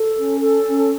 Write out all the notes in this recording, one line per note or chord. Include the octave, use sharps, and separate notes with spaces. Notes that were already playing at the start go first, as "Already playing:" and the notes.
Already playing: A4
C#4
A4
C#4